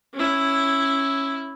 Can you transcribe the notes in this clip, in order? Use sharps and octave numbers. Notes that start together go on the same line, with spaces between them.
C#4 E4